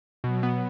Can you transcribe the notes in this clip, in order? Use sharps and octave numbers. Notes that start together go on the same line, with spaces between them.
B2 F#3
B3